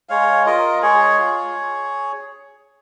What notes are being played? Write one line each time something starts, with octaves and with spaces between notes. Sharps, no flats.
G#3 C#5 F5
F4 A#4 D#5
G#3 G#4 C#5
F4